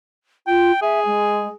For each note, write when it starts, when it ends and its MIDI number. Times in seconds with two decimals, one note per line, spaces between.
0.47 0.72 65
0.47 0.80 79
0.82 1.54 68
0.82 1.00 76
1.06 1.48 56